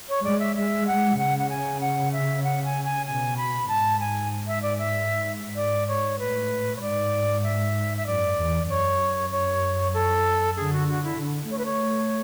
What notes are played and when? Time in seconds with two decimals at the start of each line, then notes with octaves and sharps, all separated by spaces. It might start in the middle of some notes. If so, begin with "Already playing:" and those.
0.09 C#5
0.24 G#3 D5
0.39 E5
0.56 G#3 E5
0.87 F#5
1.18 C#3 F#5
1.38 F#5
1.50 G#5
1.81 F#5
2.12 E5
2.44 F#5
2.64 G#5
2.85 G#5
3.06 B2 G#5
3.37 B5
3.68 G#2 A5
4.00 G#5
4.47 E5
4.62 D5
4.78 E5
5.56 D5
5.88 C#5
6.18 A2 B4
6.77 C#5
6.81 G#2 D5
7.43 E5
7.97 E5
8.06 F#2 D5
8.38 E2
8.69 F#2 C#5
9.32 C#5
9.94 A4
10.57 D3 G#4
10.73 F#4
10.88 F#4
11.04 E4
11.19 D3
11.50 A3 C#5
11.58 B4
11.65 C#5